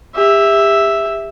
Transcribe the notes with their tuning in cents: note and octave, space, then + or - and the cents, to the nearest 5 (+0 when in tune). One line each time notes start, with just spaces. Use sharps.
G4 +40 E5 +0